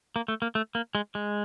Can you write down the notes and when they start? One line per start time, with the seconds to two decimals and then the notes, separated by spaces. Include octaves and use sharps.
0.16 A#3
0.28 A3
0.42 A#3
0.55 A3
0.75 A#3
0.95 G#3
1.15 G#3